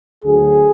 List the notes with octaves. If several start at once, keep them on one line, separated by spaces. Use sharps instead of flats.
D2 D3 F#3 G#4